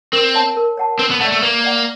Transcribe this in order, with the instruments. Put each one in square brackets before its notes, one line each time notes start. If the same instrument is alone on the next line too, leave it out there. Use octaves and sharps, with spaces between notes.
[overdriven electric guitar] C4 [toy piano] A#4
[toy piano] C#5 F#5 A5
A#4
C#5 F#5 A5
[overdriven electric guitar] C4 [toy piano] B4
[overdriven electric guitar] B3
[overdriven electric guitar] A3 [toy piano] D5 F#5
[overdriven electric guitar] A3
[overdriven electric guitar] A#3 [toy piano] B4
[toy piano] D5 F#5